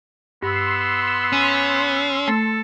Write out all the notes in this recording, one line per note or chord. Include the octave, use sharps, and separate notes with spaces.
G2 B3 C6 E6
C#4
A3 A4